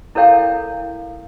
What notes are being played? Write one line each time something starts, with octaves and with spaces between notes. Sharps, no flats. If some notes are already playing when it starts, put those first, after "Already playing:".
E4 A4 A#4 C#5 F5 G5